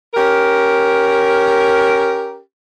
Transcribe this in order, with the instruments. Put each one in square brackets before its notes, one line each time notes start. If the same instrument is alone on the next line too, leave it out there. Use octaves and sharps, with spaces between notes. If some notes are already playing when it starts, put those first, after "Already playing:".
[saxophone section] C#4 G4 A#4